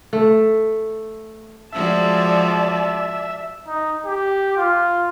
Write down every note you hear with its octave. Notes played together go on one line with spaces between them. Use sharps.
A3
F3 G#3 F#4 D5 E5 A5
D#4
G4
F4